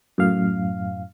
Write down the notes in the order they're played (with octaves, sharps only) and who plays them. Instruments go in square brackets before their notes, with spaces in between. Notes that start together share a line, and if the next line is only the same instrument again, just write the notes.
[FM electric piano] F#2 A2 F5